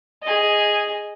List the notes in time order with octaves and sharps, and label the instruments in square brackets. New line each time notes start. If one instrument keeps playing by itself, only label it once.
[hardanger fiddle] G#4 D#5